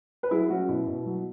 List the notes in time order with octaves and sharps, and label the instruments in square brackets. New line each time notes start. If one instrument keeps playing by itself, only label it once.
[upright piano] B4
F#3 E4 G#4
F#3 C#4 F#4
B2 E4
B2
F#3